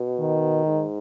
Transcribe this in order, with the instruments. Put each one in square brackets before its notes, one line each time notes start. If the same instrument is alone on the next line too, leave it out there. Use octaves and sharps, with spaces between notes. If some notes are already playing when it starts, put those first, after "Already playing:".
Already playing: [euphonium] B2
[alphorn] D#3
[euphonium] G#2